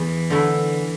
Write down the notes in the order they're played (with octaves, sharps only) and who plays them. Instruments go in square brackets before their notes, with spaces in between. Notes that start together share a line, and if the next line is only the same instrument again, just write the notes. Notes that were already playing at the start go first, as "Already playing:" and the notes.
Already playing: [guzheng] E2 [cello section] E3
[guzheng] D3 A3 E4